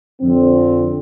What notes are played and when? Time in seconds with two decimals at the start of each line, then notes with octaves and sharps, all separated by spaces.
0.22 F2 D3 C4